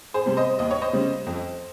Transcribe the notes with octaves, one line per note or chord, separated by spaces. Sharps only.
G#4 C5
C3 G3
C5 D#5
D#2 D#5
C#5
C5 D#5
C#3 G3
F2